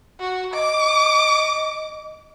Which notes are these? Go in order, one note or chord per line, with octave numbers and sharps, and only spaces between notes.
F#4
D#5 D6